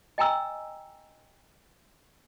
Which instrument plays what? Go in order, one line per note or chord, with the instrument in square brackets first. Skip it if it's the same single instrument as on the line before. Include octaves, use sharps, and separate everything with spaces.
[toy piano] D#5 G5 G#5 A#5 E6